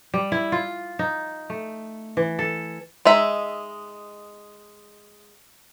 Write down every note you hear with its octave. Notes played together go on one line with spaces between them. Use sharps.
G3
E4
F4
D#4
A3
E3
A4
G#3 D#4 E5